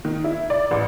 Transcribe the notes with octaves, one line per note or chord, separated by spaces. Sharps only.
D#3
E4
D5
A1